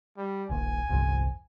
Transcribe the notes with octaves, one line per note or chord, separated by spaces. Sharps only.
G3
D#1 A#1 G#5
G1 C2 F2